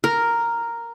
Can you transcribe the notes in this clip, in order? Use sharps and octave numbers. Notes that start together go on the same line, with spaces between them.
A#4